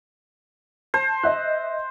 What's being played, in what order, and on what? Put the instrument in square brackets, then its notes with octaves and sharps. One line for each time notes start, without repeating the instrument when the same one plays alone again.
[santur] C5 [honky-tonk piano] A5
[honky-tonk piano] D#5 E5 F#6